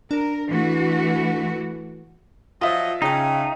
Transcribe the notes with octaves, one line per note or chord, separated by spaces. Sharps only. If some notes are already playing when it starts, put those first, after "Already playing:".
D4 A#4
E3 A3 F#4
F3 F#3 F4 D#5 E5
C#3 D#4 G5 A5